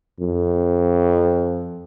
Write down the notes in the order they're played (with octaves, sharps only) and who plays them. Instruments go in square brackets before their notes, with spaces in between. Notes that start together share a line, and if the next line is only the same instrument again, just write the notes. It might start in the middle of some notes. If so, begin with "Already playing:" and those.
[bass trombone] F2